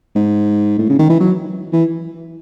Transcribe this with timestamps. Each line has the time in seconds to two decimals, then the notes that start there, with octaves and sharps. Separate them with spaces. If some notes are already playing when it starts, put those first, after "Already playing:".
0.16 G#2
0.79 A2
0.89 C#3
0.99 D#3
1.09 E3
1.20 F#3
1.73 E3